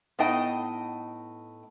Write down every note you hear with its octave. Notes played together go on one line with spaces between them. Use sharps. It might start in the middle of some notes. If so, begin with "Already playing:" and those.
A2 B3 D#4 D#5 G5